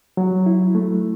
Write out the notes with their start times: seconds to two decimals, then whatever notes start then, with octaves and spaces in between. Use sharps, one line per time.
0.17 F#3
0.46 E4
0.75 A3